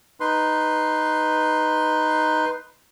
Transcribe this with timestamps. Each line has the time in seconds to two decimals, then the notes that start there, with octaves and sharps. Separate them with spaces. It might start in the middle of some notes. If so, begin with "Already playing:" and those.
0.20 D#4 B4 C6